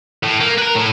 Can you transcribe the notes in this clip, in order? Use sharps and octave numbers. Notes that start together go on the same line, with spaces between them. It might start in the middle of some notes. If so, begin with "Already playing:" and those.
A2
A#3
A#4 B4
A2